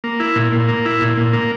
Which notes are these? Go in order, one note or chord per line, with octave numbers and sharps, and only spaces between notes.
A#3
E4
A#2
A#2
A#3
E4
A#2
A#2
A#3